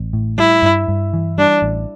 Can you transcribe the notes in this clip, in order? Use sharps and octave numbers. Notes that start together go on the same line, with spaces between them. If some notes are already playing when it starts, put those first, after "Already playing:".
Already playing: A1
A2
G3 E4
G2
G2
E3
G3 D4
A1